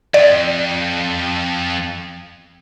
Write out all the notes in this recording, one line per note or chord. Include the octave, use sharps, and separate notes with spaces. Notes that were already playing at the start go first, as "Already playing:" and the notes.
F2 D5